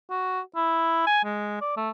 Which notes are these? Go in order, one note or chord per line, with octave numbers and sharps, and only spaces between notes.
F#4
E4
G#5
G#3
D5
A3